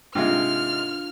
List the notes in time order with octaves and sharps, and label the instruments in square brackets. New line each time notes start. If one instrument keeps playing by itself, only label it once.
[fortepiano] G#2 C3 G#3 [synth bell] D4 [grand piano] F4 [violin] F6